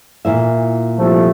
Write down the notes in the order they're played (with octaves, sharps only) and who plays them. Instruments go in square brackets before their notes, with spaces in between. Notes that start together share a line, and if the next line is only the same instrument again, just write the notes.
[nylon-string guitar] A#2 E3 E5
[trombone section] C2 F3 A3